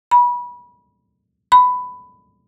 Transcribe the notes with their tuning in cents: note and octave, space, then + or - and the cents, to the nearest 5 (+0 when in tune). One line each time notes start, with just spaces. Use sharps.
B5 -25
B5 +15